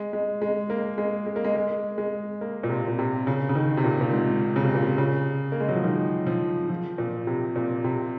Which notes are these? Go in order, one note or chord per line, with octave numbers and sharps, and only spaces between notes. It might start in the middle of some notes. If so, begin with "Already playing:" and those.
Already playing: G#3
G#3
G#3
A#3
G#3
G#3
A#3
G#3
G#3
G#3
A#3
A#2
C3
A#2
C3
C#3
C#3
D#3
C3
A#2
A#2
G#2
C#3
C3
A#2
C3
C#3
A#3
G#3
F#3
F3
D#3
F3
F3
A#2
C3
A#2
C3